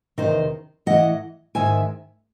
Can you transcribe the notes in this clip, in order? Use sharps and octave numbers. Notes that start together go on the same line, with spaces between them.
E2 C3 D#3 C5 D#5
A2 E3 D#5 F#5
G#2 D#3 E5 G#5